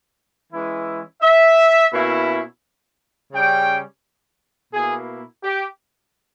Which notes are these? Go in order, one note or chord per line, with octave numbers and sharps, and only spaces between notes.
E3 G#3 C#4 E4
E5
B2 A#3 C#4 E4
C#3 G3 C#4 G5
B2 A#3 E4 G#4
G4